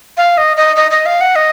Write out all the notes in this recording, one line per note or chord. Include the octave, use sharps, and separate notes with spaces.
F5
D#5
D#5
D#5
D#5
F5
F#5
D#5